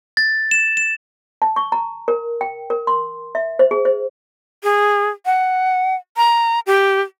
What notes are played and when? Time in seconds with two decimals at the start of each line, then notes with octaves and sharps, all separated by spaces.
0.17 A6
0.51 E7
0.77 E7
1.42 A5
1.56 C#6
1.72 A#5
2.08 A#4
2.41 G5
2.70 A#4
2.87 C6
3.35 E5
3.59 C5
3.71 G#4
3.85 C5
4.63 G#4
5.26 F#5
6.17 A#5
6.67 G4